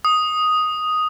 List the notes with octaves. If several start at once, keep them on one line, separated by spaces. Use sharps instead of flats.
D#6